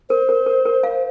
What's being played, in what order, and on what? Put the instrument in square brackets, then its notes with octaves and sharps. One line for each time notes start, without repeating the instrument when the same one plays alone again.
[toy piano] A#4 [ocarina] C5
[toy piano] A#4
A#4
A#4
F5